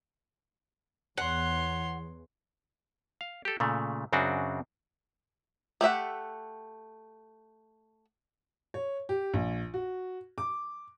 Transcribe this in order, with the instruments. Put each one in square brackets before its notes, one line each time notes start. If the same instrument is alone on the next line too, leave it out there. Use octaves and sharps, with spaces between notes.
[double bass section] E2 [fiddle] C#5 C6 [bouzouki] F#5
[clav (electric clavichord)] F5
G4 A4
A#2 C#3 A3
F#2 C#3 C4 D4 F#4
[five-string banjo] A3 G4 E5 F#5
[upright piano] C#5
G4
A#1
F#4
D6